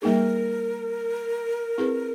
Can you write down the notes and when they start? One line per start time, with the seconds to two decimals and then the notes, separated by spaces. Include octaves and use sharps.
0.02 G3 A#3 D#4 G#4 A#4
1.78 C4 E4 G#4 B4